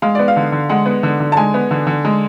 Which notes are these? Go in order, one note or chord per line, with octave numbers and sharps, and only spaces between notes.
G#3 F5
B3 D5
F5
D3
D3
G#3 F#5
B3
D3
D3
A5
G#3 G#5
B3
D3
D3
G#3